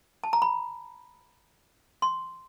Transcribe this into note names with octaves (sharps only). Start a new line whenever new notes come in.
A5
A#5
B5
C6